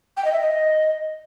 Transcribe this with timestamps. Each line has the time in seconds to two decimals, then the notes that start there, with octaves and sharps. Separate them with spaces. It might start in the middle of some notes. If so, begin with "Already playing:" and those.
0.17 G5
0.25 D#5
0.33 E5
0.40 D#5